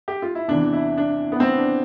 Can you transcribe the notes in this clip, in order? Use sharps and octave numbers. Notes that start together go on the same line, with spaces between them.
G4
F4
E4
E2 C3 E3 D4
E4
D4
B3
C4
D4